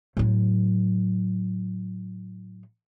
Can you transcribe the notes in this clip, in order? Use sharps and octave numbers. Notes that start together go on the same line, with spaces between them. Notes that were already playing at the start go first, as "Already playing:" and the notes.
A2 F#3